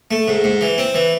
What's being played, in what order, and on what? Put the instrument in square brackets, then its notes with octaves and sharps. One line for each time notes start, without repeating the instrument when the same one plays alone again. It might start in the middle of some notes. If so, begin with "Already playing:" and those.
[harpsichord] A3
G#2
G#2
E3
C4
E3